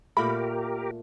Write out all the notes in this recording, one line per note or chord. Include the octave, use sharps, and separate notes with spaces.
A#2 A3 G4 A#4 B5